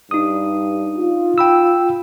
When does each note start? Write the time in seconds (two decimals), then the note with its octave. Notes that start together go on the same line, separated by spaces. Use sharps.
0.11 G2 D#4 D#6
0.97 F4
1.38 G5 B5 E6